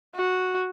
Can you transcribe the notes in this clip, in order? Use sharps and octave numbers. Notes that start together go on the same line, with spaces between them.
F#4